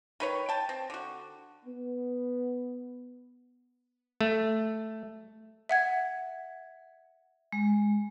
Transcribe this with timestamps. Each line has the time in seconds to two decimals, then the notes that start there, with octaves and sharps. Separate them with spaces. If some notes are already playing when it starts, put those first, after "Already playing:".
0.20 D#3 B4 C#5
0.49 G5 A5
0.69 C4
0.90 D3 F#4
1.65 B3
4.21 A3
5.69 E5 F#5 G#6
7.52 G#3